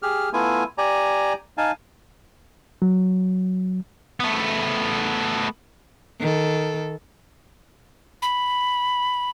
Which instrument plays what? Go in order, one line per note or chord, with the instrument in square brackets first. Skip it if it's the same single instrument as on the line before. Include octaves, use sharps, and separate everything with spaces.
[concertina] G4 G#4 F6
A3 B3 E4 F4 G#5
G4 D5 G#5 A#5
D#4 F5 G#5 A5
[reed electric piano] F#3
[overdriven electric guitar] A3 B3
[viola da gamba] D#3 A4
[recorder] B5